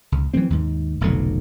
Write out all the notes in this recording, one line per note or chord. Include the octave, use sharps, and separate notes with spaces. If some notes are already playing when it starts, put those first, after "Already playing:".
C#2
E3 F#3 G3 C4
D#2 G#2
F1 B1 F2 D3